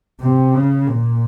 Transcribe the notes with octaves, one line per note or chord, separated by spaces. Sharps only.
C3
C#3
A#2